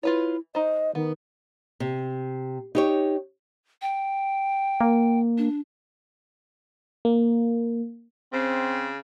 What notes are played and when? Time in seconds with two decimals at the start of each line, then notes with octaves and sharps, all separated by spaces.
0.03 E4 F4 B4 C#5
0.55 D#4 C5 D#5
0.95 D#3 B3
1.80 C3
2.75 D#4 G4 C#5
3.82 G5
4.81 A#3
5.38 D4
7.05 A#3
8.33 C#3 C4